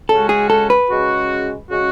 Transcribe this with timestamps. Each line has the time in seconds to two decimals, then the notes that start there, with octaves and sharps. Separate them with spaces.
0.09 C#3 G#3 C#4 F#4 A4
0.29 G#4
0.50 A4
0.70 B4
0.90 C#3 G#3 C#4 F#4
1.70 C#3 G#3 C#4 F#4